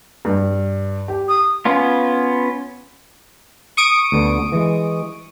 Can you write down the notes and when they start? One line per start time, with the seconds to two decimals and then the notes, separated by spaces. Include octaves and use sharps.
0.25 G2
1.08 G4
1.28 D#6
1.65 B3 C#4 F4
3.77 C#6 D#6 D7
4.12 D2 D3 B3
4.52 E3 G#3